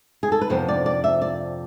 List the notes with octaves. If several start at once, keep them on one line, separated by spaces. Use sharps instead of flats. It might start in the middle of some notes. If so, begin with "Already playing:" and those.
G#4
A4
B4
F2 C3 F3 B3 D4 C5
D5
D5
E5
D5